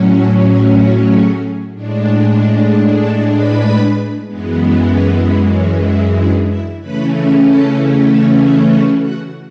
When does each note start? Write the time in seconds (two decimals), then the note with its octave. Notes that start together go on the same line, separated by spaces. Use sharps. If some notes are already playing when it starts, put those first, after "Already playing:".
Already playing: A2 F#3 C#4
0.15 A4 A5
0.47 G#4 G#5
0.78 F#4 F#5
1.10 G#4 G#5
1.73 A2 G#3 D4
2.99 A4 A5
3.31 B4 B5
4.27 F#2 E3 G#3 B3
4.90 C#4 C#5
5.21 B3 B4
5.53 C#4 C#5
5.85 E4 E5
6.17 D4 D5
6.48 E4 E5
6.80 C#3 E3 A3 C#4 B4 B5
7.43 A4 A5
8.07 A4 A5
8.39 G#4 G#5
8.70 F#4 F#5
9.03 F#4 F#5